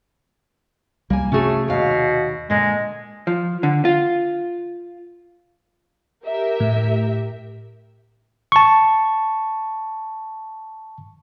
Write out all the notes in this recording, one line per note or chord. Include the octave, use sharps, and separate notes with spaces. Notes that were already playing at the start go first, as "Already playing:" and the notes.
C2 G3 A#3 G#5
C3 A3 C#4 F#4 G#4
D#2 B2 F5
A#2 D3 G#3
F3
D3
F4
G4 A#4 E5
A2
A5 C#6